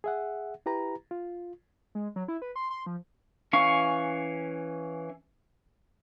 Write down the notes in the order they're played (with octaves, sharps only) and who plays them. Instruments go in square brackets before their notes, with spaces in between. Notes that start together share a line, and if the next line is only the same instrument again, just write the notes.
[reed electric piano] G#4 E5 F#5
E4 G4 B4 A#5
F4
[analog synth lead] G#3
F#3
E4
B4
C6
C6
F3
[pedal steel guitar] E3 C#4 F5 C#6